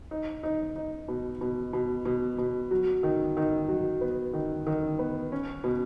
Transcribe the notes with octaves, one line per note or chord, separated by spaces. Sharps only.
D#4
D#4
D#4
B2
B2
B2
B2
B2
F#3
D#3
D#3
F#3
B3
D#3
D#3
B3
C#4
B2